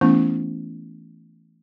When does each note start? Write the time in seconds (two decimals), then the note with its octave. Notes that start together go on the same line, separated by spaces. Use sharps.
0.01 E3 A3 B3 C#4 E4